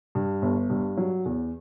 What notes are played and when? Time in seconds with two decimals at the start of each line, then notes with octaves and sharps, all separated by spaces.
0.15 G2
0.42 G1
0.70 G2
0.97 F#3
1.25 E2